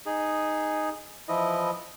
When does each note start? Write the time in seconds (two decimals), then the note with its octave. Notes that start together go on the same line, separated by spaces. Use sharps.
0.06 D#4 G#4
1.29 E3 F3 E4 D#5